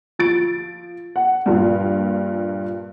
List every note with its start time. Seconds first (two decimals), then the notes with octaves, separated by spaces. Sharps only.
0.19 F3 A6 D7
1.16 F#5
1.46 G2 A#2 F3